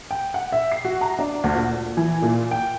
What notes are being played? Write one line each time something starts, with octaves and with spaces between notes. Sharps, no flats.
G5
F#5
E5
C7
F#4
A#5
D4
D2
A#2
E3
A#2
G5